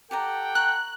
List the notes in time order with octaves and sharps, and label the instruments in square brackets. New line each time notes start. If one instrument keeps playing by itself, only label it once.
[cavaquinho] G4 D5 A#5 [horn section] A4 F#5 G5
[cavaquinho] A#5 C#6 [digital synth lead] F#6